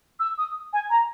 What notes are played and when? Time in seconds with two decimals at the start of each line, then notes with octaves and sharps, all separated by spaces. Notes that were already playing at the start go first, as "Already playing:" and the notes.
0.19 E6
0.38 D#6
0.73 G#5
0.90 A#5